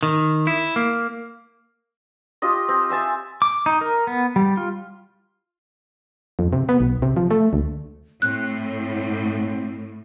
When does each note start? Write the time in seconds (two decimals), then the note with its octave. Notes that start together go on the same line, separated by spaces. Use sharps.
0.03 D#3
0.47 E4
0.76 A#3
2.42 F4 G4 D#5
2.69 C4
2.90 E5 G#5 A5
3.42 D6
3.66 D#4
3.81 A#4
4.07 B3
4.36 G3
4.57 F4
6.39 F2
6.53 C3
6.69 B3
6.80 B1
7.02 C3
7.17 F3
7.31 A3
7.53 D2
8.22 A2 C4 F#6